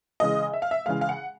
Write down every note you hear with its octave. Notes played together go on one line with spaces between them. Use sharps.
C#3 E3 G#3 D#5
E5
F5
E5
C#3 E3 G#3 F5
F5
F#5